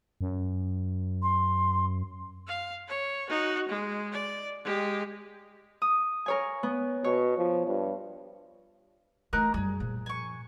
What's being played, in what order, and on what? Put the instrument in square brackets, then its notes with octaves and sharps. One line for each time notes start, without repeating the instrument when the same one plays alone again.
[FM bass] F#2
[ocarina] C6
[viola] F5
C#5
D#4 F#4
G#3
D5
G#3 G4
[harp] D#6
A#4 C#5 G#5
B3
[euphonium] B2 [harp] C#5
[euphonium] F3
G2
[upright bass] E3 A3 [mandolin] D#4 A#4 F#6
[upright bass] F#2 G3 [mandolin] G#4
[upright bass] A#2 F3
[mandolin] G#5 C#6